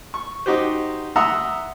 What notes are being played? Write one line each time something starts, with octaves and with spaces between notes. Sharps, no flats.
C#6
D#4 F#4 G4 C5
E5 F#5 A#5 C6 D#6 E6